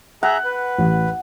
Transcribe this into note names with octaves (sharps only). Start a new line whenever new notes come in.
G#4 E5 F#5 A#5
B4
A1